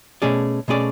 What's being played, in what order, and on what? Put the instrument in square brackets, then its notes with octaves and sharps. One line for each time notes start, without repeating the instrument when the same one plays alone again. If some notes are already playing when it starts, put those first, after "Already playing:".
[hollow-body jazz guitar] B2 A3 C#4 G#4 D5
B2 A3 C#4 G#4 D5